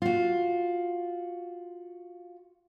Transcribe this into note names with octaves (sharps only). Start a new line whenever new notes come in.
F4 F#4